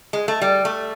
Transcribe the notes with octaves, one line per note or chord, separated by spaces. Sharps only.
G#3
A3
G3
A3